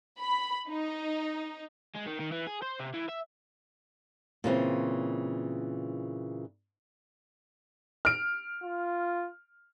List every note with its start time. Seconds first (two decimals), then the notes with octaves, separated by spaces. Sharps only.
0.18 B5
0.69 D#4
1.95 G#3
2.06 D#3
2.20 D#3
2.32 E3
2.47 G#4
2.62 C5
2.80 C3
2.94 E3
3.09 E5
4.44 A#2 C#3 E3 C4
8.05 F6 D7
8.64 F4